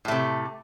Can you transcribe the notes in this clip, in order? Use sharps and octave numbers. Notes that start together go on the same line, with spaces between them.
A2 C3 A3